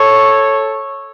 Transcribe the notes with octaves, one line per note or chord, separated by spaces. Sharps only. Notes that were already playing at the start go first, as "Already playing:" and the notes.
Already playing: A4 C#5